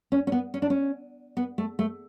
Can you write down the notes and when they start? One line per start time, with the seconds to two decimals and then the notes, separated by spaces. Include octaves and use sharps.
0.12 C#4
0.27 C#4
0.32 B3
0.54 C#4
0.62 D4
0.70 C#4
1.37 B3
1.58 A3
1.79 A3